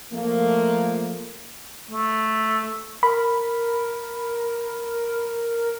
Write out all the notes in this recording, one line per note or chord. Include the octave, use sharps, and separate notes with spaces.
F3 A3 A#3
A3
A#4 B5